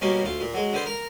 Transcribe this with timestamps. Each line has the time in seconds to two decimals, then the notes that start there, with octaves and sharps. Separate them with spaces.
0.01 B2 G3 A#3 C#4
0.23 D2 F4
0.41 A#2
0.54 F#3 G#3
0.73 D3 B3 C5
0.86 A#4 A#5